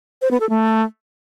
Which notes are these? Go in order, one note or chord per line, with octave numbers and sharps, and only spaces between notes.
C5
B3
A4
A3